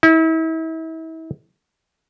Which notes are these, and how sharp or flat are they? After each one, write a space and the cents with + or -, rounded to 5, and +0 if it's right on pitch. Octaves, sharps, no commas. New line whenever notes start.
E4 -35